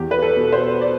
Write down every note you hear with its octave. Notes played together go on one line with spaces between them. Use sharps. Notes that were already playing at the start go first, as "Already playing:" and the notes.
Already playing: E2 G4
B4
A4
B2
C5
D5